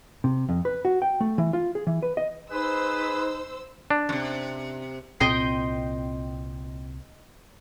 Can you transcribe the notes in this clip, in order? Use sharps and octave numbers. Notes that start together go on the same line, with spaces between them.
C3
F2
B4
F#4
G5
A3
E3
F4
G#4
E3
B4
D#5
D#4 G#4 B4 C5 E6
D4
F#2 C3
C2 A#2 C4 D#5 G5 C6